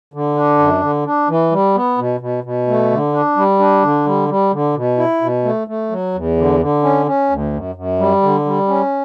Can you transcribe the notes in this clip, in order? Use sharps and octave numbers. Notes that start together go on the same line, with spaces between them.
D3
D4
F#2
D3
D4
E3
G3
B3
B2
B2
B2
A3
D3
D4
G3
D4
D3
G3
G3
D3
B2
E4
B2
A3
A3
F#3
E2
D3
D3
C#4
C#4
D2
F#2
F#2
G3
D3
G3
C#4